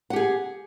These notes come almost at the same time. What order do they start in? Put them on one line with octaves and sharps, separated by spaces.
F#5 G4 G#4